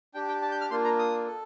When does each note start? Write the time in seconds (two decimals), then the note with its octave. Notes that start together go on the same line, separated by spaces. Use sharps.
0.14 D4 G4 G5
0.28 G5
0.42 A5
0.52 G6
0.61 F6
0.70 A#3 D4 F4 C6
0.84 A#5
0.99 D#6
1.27 A4